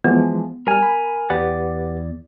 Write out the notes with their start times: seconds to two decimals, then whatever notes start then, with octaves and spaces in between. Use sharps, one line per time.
0.04 E3 F3 G#3 B3
0.67 G3 A#4 G#5 F6
0.83 B5
1.30 E2 G4 B4 D5 F#5